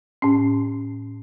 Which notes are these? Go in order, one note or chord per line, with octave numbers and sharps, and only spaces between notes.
A2 C#4